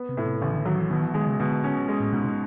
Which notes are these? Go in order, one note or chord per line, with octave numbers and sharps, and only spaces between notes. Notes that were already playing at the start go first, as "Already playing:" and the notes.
Already playing: B3
C3
A2
C3
A1 C#3
D3
D#3 F#3
E3
B2 D#3
E3
D#3 G#3
C#3
B2 D3
C#4
G#3
A2
G#2 B2
B2